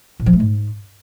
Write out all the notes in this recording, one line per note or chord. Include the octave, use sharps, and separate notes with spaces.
A#2
F3
A3
G#2